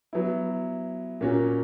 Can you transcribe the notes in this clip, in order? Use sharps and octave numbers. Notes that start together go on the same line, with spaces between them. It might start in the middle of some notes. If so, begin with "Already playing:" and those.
F#3 B3 E4
A#2 A#3 C#4 F#4